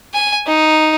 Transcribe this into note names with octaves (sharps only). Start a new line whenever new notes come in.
G#5
D#4